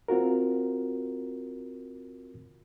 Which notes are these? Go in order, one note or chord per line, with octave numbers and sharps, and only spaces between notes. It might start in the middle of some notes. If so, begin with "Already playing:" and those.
C4 F4 F#4 A#4